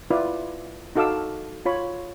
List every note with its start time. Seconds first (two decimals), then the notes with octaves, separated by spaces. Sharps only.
0.10 E4 F4 B4 D5
0.95 D#4 F#4 A4 F5 D6 E6
1.65 F4 C#5 B5